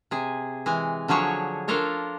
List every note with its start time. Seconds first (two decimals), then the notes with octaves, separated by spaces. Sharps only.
0.11 C3 G#4
0.66 E3 G#3 G#5
1.08 D3 F3 F#3 G#4 C#5
1.68 D4 F4 A4 A#4 C#5